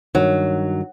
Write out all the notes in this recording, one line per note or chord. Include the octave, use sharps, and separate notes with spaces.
G2 D#3 F#3